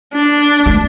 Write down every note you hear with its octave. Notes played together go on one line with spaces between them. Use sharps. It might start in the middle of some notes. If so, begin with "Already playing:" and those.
D4
A3